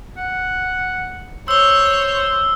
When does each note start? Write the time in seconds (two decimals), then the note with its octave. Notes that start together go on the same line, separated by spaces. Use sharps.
0.17 F#5
1.48 C5 C#5 E6 G7